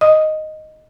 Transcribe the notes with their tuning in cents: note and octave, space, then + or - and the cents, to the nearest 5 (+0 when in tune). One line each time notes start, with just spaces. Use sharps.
D#5 +0 D#6 +0